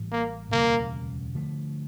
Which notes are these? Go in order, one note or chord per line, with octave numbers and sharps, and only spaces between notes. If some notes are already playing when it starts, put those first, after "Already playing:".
Already playing: A1 A2 E3 G3
A#3
E1 D2 C#3 G3 A#3
D3 F3 A3